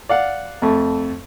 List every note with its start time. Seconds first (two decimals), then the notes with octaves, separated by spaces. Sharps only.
0.09 D5 F5 F#5
0.62 F2 A3